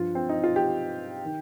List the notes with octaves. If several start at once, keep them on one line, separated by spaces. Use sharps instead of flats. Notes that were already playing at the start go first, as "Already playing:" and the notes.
Already playing: G2 F3 F4
C4
D#4
F4
G4
D#3